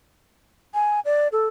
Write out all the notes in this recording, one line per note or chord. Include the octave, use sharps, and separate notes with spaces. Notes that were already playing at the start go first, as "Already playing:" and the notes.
G#5
D5
A4